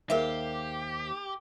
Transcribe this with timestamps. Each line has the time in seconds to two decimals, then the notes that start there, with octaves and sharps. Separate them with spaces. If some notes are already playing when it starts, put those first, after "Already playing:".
0.10 D#2 G4 G#4 A#4 C5 E5 F5